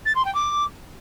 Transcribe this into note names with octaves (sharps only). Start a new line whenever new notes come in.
A6
C6
G5
D6